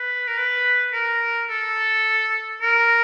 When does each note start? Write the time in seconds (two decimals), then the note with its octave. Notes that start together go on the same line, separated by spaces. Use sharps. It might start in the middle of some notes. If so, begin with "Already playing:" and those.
Already playing: B4
0.27 A#4
0.37 B4
0.93 A#4
1.49 A4
2.62 A#4